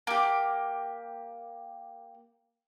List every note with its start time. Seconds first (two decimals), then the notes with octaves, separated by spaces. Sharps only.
0.07 A#3 G4